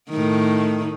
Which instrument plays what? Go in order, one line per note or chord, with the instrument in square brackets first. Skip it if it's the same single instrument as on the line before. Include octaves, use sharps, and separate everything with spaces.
[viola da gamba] A2 D#3